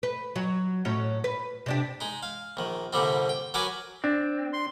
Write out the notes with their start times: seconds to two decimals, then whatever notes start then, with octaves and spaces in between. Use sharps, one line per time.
0.03 B4
0.36 F#3
0.85 A2 F#3 C#4
1.24 B4
1.66 C3 D4 G4
2.01 G#3 D#4
2.23 F5
2.57 A#1 D#3
2.93 C2 A#2 D3 G3 C4
3.29 G5
3.54 F#3 A#4 B4 G#5 C#6 D6
4.04 C4 D4
4.53 C6